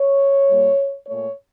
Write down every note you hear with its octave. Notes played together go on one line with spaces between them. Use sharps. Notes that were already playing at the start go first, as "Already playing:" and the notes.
Already playing: C#5
A#2 G3 A#3
A#2 A3 C#5